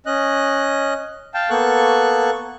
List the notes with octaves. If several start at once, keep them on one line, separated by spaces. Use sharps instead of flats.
C#4 D#5 F#6
F5 G5 A5
A#3 B3 A4 C#6 F#6